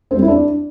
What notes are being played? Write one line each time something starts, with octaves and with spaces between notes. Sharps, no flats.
C4
G3
E4
D4